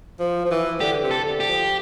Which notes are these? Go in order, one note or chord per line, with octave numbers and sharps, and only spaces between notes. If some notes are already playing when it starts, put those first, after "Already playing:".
F3
F3
E3
D3 G4
C3
A4
D3
G4
F3